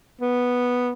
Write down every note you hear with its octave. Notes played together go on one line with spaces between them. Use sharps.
B3